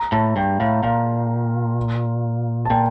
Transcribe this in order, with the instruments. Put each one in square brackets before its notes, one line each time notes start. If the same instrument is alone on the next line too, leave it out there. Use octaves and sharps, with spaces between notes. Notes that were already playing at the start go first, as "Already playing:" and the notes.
Already playing: [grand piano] A#5
[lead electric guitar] A2 [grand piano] A5
[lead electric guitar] G2 [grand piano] G5
[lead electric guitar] A2 [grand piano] F5
[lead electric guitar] A#2 [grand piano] F5
[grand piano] A5
[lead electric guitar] A#2 [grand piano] G5